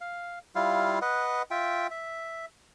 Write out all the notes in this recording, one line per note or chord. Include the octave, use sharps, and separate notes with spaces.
F5
G3 E4 F4 F5
B4 D#5 F#5
F4 E5 G5
E5